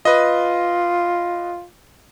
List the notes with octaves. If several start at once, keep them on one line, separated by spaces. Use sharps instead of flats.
F4 B4 D#5